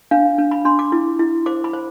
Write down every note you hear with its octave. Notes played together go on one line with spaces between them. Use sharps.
D4 F5
D4
B5
D4 C6
D6
E4
E4
C5 D6
B5
C5